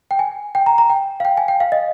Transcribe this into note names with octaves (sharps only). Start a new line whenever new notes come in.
G5
G#5
G5
A#5
A#5
G5
F5
G5
G#5
G5
F5
D#5